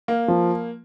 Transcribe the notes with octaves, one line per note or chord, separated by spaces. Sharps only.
A#3
F3